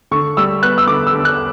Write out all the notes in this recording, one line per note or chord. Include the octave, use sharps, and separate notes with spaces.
D3 C#6
G3 E6
B3 F#6
E6
D3 D6
E6
D3
F#6